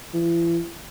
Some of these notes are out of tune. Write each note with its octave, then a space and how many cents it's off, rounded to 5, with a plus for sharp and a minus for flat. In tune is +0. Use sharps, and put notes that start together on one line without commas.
E3 +40